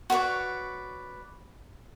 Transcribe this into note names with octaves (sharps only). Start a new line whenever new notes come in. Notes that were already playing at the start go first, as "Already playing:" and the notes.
F#4 B4 C#5 D5